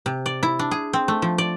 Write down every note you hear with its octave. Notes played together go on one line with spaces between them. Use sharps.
C3
D5
E4
D4
G#4
C4
A3
F3
D5